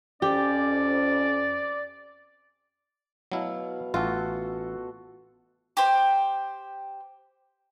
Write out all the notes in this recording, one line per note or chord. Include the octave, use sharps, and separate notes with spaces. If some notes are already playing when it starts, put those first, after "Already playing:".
F2 C#4 G4 D5
B2 F#3 E4 F5
A1 F4 F#4 A4
G4 C5